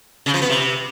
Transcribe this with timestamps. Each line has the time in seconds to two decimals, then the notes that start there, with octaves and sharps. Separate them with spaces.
0.26 C#3
0.34 F3
0.42 B3
0.49 C3